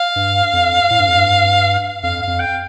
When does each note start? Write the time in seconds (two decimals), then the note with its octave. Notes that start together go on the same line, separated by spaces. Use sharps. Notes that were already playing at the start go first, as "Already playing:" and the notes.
Already playing: F5
0.16 G2
0.53 F2
0.90 A2
1.00 G2
1.08 F2
1.17 G2
2.02 F2 F5
2.22 F5
2.27 F2
2.40 G5